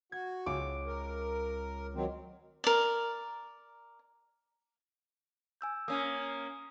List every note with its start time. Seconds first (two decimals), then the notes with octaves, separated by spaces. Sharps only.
0.12 F#4 G#6
0.46 C#2 D6
0.87 A#4
1.95 D#3 F#3 C4
2.64 A#4 D5
5.61 G#5 E6 G6
5.88 A#3 C#4 D#6